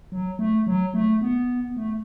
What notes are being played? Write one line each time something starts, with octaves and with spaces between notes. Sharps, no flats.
F#3
A3
F#3
A3
B3
A3